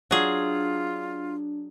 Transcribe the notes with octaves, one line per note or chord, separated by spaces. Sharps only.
F#3 D4 F4 G#4